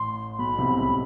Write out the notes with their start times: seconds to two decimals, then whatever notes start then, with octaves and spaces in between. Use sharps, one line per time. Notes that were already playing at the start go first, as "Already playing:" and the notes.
Already playing: A1 A2 C6
0.39 B1 B2 B5
0.58 C2 C3
0.77 C#2 C#3